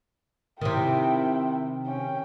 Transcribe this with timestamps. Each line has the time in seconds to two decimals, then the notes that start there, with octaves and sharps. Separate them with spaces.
0.61 C3 D#3 E4 G5
1.86 C#4 G5